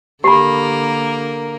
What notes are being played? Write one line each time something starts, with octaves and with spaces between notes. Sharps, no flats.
D3 A#3 G4 A#4 B5